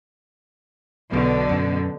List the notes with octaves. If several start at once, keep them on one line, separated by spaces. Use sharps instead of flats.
B1 B2 D3
F#2